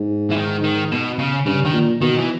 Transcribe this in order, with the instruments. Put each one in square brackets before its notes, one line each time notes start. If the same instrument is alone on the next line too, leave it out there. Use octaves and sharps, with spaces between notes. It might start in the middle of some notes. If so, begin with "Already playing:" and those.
Already playing: [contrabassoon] G#2
[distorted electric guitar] E3
D#3
D#3
B2
C#3
[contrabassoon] G2 [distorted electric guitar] C#3
[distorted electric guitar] D#3
[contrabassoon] A#2
[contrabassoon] B2 [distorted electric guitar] D#3
[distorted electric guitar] E3